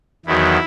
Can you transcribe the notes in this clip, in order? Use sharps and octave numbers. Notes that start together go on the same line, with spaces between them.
E2 D#3 F#3 E4